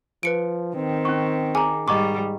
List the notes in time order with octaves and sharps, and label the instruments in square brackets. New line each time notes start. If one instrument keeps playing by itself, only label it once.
[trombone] F3 [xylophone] B4 C#7 D7
[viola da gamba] D#3 [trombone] C4
[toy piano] C#4 C#6
[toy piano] G#4 [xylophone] G#5 A#5
[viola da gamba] G#2 G3 [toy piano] D#5 A#5 C#6 [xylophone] D6